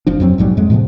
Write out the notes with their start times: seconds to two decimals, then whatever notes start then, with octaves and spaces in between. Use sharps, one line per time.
0.07 F#1 F3 D4
0.20 F2 F#3 C4
0.38 A#1 G#2 F#3 G3
0.57 F2 G#3
0.70 A2 C3 F3 B3